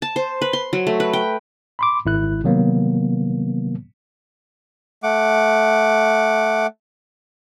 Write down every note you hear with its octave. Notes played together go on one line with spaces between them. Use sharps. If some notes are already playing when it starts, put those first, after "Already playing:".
A5
C5
B4
C6
F#3
A3
B4
G5
B5 C6 D6
G#1 E4 F#6
C3 D#3 F#3 A#3 B3
A3 F#5 D6